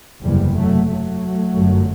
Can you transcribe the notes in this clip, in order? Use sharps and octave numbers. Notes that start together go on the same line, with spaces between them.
F#1 E2 C3 E3 G3
F#3 A3
F#3 A3
G1 F#2